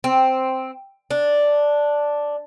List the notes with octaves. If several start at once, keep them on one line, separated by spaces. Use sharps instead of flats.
C4
D4